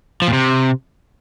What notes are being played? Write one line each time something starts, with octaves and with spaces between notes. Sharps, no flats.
F3
A#2
C3